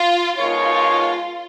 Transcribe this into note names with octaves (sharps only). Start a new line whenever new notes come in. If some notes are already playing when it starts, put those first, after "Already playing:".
Already playing: F4
B2 G#3 D#4 F4 A#4 C#5